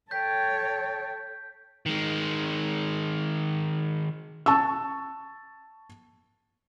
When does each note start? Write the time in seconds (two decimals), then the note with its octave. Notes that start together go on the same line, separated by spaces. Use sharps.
0.11 A4 C#5 G5 G6 B6
1.86 D#3 G#3
4.46 A5 C#6 E6